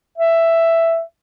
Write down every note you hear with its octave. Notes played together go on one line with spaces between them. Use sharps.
E5